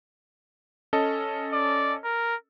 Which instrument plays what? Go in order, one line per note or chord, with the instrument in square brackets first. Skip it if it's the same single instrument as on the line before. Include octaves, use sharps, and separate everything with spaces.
[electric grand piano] C#4 A4 D#5
[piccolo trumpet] D5
A#4